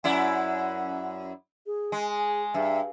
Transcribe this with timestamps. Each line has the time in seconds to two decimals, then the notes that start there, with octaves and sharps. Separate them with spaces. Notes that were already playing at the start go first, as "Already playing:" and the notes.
0.04 F#2 E4 D5 F#5
1.66 G#4
1.92 G#3
2.54 G2 E5